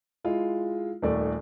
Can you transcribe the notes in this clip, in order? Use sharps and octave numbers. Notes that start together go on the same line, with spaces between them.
G#3 E4 F4
D#1 D#2 A3 D5